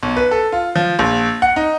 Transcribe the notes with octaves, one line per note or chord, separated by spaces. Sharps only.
B1
B4
A4
F4
F3
A#1
F#5
D#4